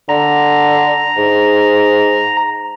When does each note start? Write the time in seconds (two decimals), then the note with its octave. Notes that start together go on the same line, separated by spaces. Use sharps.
0.09 D3 A#5
1.17 G#2